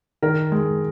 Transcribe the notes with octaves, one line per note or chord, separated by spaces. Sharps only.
D#3 A#4
G#3